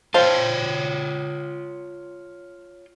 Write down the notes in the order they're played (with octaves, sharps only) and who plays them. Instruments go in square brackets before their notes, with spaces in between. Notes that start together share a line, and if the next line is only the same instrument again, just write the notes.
[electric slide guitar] F4 C#5 G5 [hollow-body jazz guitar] C5 F5 A5